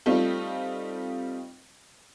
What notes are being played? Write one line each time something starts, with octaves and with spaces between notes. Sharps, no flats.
G3 A3 C4 D#4 F4 G4